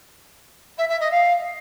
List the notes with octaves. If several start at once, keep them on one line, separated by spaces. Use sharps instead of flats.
E5
E5
D#5
F5